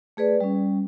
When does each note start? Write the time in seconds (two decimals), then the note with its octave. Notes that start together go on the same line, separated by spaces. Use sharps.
0.17 A3 G#4 B4 D5
0.40 G3 C#4